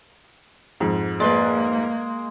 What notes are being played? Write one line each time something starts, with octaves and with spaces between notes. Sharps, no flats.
F2 G#2
G#3 A#3 B4 C5 D5